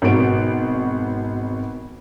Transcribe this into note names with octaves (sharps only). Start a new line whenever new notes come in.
G#1 B2 B3 F#4 D7